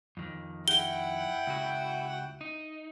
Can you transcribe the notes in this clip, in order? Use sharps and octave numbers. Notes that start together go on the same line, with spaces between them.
F2 D#3
E4 F#5 G5 G7
C#2 F#4
D#4